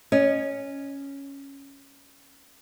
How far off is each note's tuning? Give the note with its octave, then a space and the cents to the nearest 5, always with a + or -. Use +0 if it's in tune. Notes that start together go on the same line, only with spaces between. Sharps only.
C#4 +0 D#5 -20